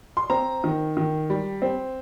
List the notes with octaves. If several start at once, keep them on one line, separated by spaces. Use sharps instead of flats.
C6
C4 A#5
D#3
D#3
G3
C4